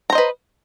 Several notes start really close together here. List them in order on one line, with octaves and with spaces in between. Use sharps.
A#5 C5 D#5 B4